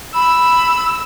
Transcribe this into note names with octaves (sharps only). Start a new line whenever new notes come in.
B5 E6